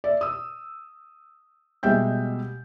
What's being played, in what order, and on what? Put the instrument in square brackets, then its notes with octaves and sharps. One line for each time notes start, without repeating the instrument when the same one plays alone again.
[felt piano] D5 E5
D#6 E6
B2 G3 G#3 E5 G5 G6